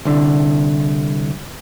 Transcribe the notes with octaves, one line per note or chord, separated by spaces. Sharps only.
C2 D3